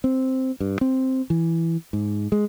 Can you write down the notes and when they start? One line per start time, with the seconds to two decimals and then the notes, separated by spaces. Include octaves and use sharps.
0.04 C4
0.60 G2
0.81 C4
1.30 E3
1.93 G#2
2.32 G#3